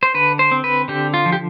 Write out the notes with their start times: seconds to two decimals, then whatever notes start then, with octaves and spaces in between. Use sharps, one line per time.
0.03 C5
0.14 D3 B4
0.39 C5
0.52 C4
0.64 B4
0.88 D3 G4
1.14 F4
1.26 F3
1.32 G4